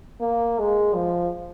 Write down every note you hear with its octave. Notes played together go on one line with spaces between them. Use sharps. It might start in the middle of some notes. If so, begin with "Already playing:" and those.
A#3
G#3
F3